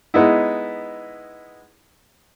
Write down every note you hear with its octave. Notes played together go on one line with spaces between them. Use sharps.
G#3 B3 D#4 E4